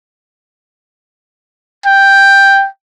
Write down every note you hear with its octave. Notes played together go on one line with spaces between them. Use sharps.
G5